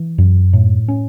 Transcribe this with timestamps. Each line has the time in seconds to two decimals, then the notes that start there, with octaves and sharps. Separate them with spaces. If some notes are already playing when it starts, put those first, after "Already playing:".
Already playing: E3
0.18 F#2
0.53 A2
0.88 C#4